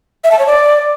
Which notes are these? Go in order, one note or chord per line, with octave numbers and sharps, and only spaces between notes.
E5
A5
C#5
D5